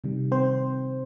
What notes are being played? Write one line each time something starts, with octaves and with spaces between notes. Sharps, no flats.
C3 D#3 G3
C4 C5